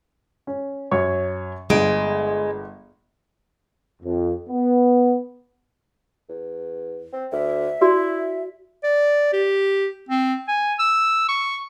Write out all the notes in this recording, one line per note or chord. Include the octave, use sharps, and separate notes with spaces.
C#4
F#2 C#5 C#6
G1 G#3 D7
F2
B3
E2
C4
D2 E5
E4 F#4 D5
D5
G4
C4
G#5
E6
C#6